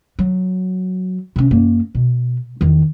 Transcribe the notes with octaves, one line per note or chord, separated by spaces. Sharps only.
F#3
C3 C#4
F#2 A#3
B2
E2 D#3